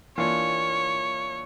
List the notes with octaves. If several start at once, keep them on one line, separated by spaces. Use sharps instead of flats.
E3 A#3 D4 F4 C#5